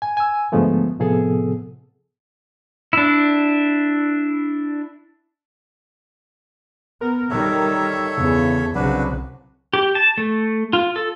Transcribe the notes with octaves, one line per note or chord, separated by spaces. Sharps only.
G#5
G#5 E6
D2 G#2 F3 G#3 A3 B3
A2 C3 F3 B3 G#4 A4
D4 E4
B3 A#4
D#3 G3 A4 C#5 E5
E2 C#3
C2 C#3 F#3 D4 F#4 B4
G4
A5
A3
F4
A4